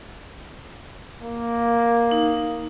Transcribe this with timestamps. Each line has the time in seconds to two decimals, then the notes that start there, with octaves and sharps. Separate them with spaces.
1.23 A#3
2.11 D#4